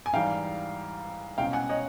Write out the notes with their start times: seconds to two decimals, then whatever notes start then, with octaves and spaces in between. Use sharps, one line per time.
0.06 G#5
0.13 G#2 E3 G3 F5 G5
1.38 C2 B2 G#3 C#4 F5 G5
1.53 F#5 G#5
1.69 C#5 D#5